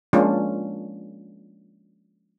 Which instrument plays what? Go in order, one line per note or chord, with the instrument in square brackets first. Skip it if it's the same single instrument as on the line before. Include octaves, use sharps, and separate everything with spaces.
[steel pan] F3 G#3 A#3 C#4 D4 F4